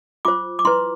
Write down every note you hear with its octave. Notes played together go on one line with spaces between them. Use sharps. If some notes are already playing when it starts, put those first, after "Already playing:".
F4 C5 D6
D6
E4 B4 C6